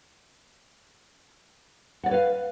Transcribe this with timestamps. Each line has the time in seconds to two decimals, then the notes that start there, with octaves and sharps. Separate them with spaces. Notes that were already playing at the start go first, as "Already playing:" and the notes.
2.03 F#5
2.06 D5
2.09 C#5
2.11 B4
2.14 F5